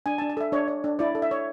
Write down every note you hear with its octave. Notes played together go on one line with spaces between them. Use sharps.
D4 G#5
A5
D4
A5
A4 E5
D4 C#5
C#5
D4
E4 D5
A4
E5
C#5